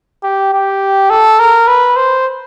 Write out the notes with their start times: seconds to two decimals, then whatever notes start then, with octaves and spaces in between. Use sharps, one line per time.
0.24 G4
0.53 G4
1.10 A4
1.39 A#4
1.68 B4
1.96 C5